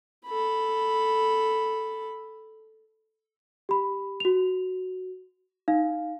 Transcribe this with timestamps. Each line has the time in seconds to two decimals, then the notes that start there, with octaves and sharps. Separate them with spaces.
0.26 A4 B5
3.69 G4 B5
4.20 F#4 F7
5.68 D#4 F5